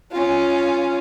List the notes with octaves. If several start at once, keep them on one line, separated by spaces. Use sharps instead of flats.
C#4 F4